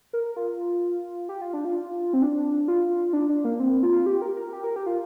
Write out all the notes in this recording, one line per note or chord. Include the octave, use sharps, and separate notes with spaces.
A#4
F4
G4
F4
D4
F4
C4
D4
F4
D4
D4
A#3
C4
F4
G4
A#4
A#4
G4
A#4
G4
F4